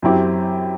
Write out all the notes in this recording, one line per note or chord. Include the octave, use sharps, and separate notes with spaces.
F#2 F#3 C4 E4 G4